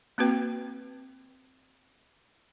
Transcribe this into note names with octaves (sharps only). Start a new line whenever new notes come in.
A#3 C4 F#4 B4 G5